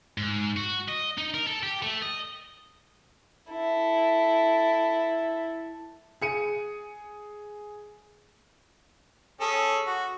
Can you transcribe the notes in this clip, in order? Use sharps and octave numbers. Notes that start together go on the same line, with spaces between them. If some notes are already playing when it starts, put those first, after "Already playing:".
G#2
F#4
D#5
D#4
A#4
A4
G4
A3
D#5
E4 A4
G#4 C#7 D#7
C#4 G#4 A4
F#4